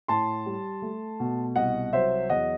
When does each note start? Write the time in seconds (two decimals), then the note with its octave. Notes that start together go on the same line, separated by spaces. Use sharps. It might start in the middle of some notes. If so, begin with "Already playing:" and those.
0.08 A2 A5 C6
0.46 G3
0.82 A3
1.20 B2
1.56 C2 D#5 F#5
1.93 F#3 C5 E5
2.30 E2 D#5 F#5